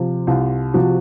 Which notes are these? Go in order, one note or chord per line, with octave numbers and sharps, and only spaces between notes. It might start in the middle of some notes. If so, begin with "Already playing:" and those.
Already playing: C3 F3
C2 F4
C3 F3 F#4